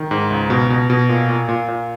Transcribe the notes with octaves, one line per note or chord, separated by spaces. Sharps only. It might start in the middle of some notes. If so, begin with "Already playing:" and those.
Already playing: D#3
G#2
C#2
B2
B2
B2
A#2
A#2
A#2
A#2